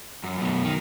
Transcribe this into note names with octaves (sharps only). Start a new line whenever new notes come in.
F#2
F#2 B2
D#3